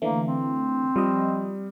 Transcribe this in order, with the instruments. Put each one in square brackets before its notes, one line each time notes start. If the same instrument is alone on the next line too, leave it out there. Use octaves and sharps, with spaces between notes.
[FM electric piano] D3 E3 A3 [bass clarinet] A#3
[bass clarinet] C4
[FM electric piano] F3 D#5 [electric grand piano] G3